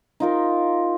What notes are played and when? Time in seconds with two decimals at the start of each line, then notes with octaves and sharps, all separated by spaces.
0.20 D#4 F4 A#4